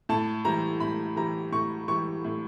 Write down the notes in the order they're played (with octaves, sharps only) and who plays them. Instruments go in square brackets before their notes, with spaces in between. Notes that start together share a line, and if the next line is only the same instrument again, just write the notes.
[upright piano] A2 A5
E3 G3 A#5
A2 B5
E3 G3 A#5
A2 C#6
E3 G3 C#6
A2